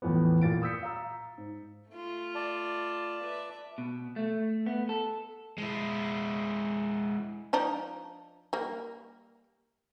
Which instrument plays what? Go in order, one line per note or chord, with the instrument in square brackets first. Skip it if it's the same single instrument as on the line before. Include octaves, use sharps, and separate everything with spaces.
[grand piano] E2 A2 E3 F3 B3
A#2 A6 D7
D#6 E6 G6 B6 C#7
F5 A#5 E6
G#2
[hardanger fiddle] A3 F4
[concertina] D5 A5
[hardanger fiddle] B4 E5
[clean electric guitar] B2
A3
B3
A4
[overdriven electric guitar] G#3 E4
[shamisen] F3 D4 D#4
G3 A#3